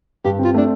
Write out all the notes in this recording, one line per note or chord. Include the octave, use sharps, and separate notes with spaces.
G2 G4
C4
F4
A3 D4